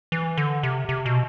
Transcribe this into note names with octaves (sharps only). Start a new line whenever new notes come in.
E3
D3
C3
C3
B2